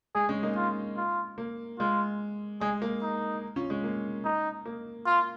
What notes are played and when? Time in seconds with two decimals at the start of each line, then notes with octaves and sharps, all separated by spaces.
0.15 G#3 G#4
0.29 G#3 C#4
0.43 A#3 D#4
0.56 F4
0.97 F4
1.38 A#3
1.79 G#3 F4
2.61 G#3 G#4
2.82 A#3
3.02 D#4
3.56 C#4 F4
3.70 G#3 C#4
3.84 A#3
4.25 D#4
4.66 A#3
5.06 F4